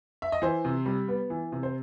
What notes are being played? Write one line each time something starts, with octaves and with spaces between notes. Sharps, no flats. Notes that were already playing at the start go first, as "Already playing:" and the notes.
E5
D#5
E3 C5
C3
G3
B3
E3
C3
C5